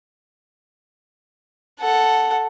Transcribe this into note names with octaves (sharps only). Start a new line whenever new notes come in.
A4 F#5